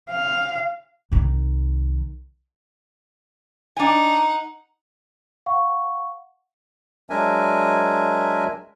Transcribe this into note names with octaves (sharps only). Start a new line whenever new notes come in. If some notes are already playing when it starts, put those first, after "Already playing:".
F5
C2 D#3
D4 D#4 F#5 G#5
F5 F#5 C#6
F#3 G#3 D4 A#4 E5 G#5